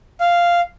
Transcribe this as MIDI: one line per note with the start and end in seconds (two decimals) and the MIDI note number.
0.21 0.60 77